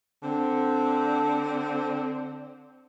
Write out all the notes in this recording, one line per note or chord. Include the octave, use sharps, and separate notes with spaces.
D3 C4